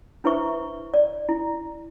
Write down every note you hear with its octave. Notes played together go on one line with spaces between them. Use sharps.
D4 E4 B4 C5 E5 C#6
D5
E4